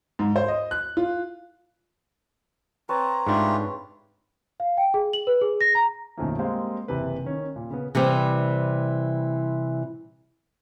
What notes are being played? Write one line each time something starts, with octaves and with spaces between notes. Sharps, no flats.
G#2
C5
D#5
F#6
F4
C4 B4 C#5 A5 A#5
G#2 A3 D4 F4 G4
F5
G5
G#4
F#7
B4
G#4
A#6
A#5
B1 F#2 D#3 F3 A3 A#3
G3 G#3 A#3 C4 C5 F5
F#1 C3 E3 B4
D#3 C#4
A#2
C#3 B3
C3 E3 G3 C4